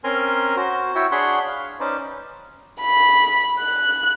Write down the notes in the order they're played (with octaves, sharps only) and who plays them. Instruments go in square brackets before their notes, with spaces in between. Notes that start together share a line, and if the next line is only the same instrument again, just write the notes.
[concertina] C4 C#4 A#4 G#5 A#5 C6
F#4 C5
E4 F#4 C#5 E5 G5 C#6
D4 G#4 C#5 F#5 B5 C6
F5
C#4 D#4 B4 C5 D5
[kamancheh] B5
F#6